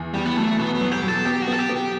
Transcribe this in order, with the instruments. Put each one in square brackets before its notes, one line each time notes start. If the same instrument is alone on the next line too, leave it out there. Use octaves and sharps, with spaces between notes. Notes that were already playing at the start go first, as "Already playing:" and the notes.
Already playing: [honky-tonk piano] E2
[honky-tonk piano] E2 [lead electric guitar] G3
[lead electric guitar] B3
[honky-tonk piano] F#3 [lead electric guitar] A3
[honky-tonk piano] B2 [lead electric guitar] B3
[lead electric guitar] B3
[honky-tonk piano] F#3
[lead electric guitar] G4
[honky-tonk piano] F#3 [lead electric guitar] A4
[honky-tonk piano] B3 [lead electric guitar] G4
[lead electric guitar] F#4
[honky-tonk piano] B3 [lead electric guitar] A4
[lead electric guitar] G4
[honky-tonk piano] B3
[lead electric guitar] G4